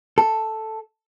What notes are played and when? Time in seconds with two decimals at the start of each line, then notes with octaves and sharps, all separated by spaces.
0.18 A4